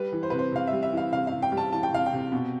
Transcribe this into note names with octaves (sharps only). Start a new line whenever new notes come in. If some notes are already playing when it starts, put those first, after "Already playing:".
Already playing: G3 B4
E3
C5
C3 B4
C5
C3 F5
E5
G3
E5
E3
F5
C3 F5
F5
C3
G5
G3
A5
E3 A5
G5
C3 F5
G5
C3
B2